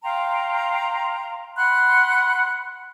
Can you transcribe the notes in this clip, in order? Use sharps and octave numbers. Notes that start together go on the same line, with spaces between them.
F5 G5 A#5 C6
F#5 B5 C6 F#6